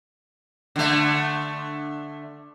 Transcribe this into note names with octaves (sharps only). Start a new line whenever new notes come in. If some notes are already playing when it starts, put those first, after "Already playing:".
D3 A3